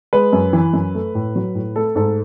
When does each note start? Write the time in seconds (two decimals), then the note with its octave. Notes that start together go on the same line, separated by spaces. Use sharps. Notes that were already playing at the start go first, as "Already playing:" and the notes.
0.13 G#3 B4
0.33 F#2
0.53 E3
0.73 F#2
0.95 A3
1.15 A2
1.36 F#3
1.55 A2
1.76 A3 A4
1.95 G#2 A4